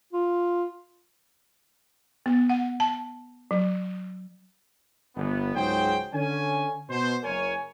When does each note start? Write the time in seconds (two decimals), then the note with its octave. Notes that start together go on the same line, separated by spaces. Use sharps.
0.13 F4
2.26 B3
2.50 F#5
2.80 A5
3.51 F#3
5.16 G1 B3
5.55 C#2 G#2 F#3 G#4 C5 G5
6.13 D3 C#4 G#5
6.90 B2 C5
7.23 F#1 A#4 C#5 G#5